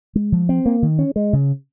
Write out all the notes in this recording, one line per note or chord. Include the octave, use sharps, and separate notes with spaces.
G#3
F3
C4
A#3
D#3
C#4
G#3
C#3